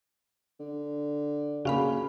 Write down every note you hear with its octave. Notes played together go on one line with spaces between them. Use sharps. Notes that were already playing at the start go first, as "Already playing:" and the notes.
D3
C#3 A#3 F#4 F5 B5